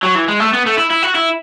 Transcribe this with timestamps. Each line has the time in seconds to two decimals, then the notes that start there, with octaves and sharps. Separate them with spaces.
0.03 F#3
0.15 E3
0.28 G#3
0.40 A3
0.53 B3
0.66 A3
0.77 E4
0.90 E4
1.02 F#4
1.15 E4